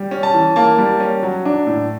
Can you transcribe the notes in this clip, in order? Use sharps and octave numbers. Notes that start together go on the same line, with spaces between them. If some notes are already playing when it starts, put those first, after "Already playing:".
Already playing: G3
C#4
A5
E3
A#3 A5
G3
C#4
F#3
D4
A2